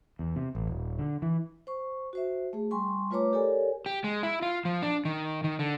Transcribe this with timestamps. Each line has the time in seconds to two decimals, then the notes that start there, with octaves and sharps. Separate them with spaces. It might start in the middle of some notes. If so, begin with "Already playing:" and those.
0.19 E2
0.36 C3
0.55 A1
0.68 D#1
0.99 D3
1.22 E3
1.67 C5 C#6
2.13 F#4 C5 E5
2.53 A3 G#4
2.71 G3 G#5 C6 C#6
3.11 A3 F4 B4 C#5 A#5 D6
3.33 G4 A4 A#4 C#5 D5 G#5
3.86 G4
4.04 G#3
4.23 E4
4.42 F4
4.65 F3
4.82 D4
5.05 D#3
5.44 D#3
5.59 D3